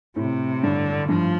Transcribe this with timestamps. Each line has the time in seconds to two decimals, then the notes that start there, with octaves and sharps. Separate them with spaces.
0.16 A2 C3
0.63 G2 D3
1.09 G2 F3